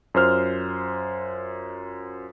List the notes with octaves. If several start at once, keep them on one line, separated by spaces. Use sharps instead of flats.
F#2 F4 C5 F6